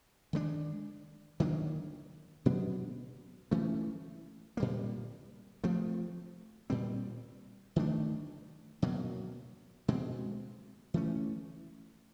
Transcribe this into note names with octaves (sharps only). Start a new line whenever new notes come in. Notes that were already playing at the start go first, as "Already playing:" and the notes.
D#3 G#3 B3 D4
D#3 F#3 A#3 D4
B2 F#3 B3 D4
E3 A3 C#4
A#2 G3 A#3
F3 A3 C4
A#2 G3 C4
D#3 F#3 A3 D4
B2 F#3 A#3
B2 G#3 C4
E3 A3 C#4